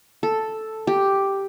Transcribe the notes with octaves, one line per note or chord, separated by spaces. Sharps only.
A4
G4